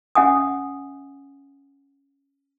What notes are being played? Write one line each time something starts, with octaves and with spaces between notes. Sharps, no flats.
C#4 E5 F#5 G#5 D#6